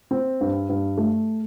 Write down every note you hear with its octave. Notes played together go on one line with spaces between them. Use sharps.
C4
G2
G2
A3